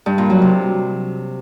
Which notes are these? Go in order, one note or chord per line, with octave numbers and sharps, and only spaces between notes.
G2
A#2
F#3
C3